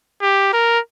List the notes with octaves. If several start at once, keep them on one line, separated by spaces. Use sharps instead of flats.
G4
A#4